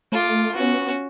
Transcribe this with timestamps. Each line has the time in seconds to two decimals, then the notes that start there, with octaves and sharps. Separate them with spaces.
0.12 A3 F4 D6
0.55 B3 C#4 F#4